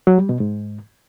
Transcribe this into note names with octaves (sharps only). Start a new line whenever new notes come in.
F#3
G3
B2
G#2